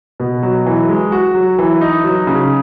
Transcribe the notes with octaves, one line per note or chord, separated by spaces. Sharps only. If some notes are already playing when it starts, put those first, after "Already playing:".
B2
F#3
E3
G#3
F#4
F#3
E3
D#4
F#3
C#3